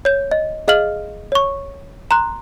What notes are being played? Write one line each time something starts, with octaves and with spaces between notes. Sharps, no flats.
C#5 G6
D#5
G#4 D#5 F5 F6 F#7
C#5 C#6
A#5 C6 F#6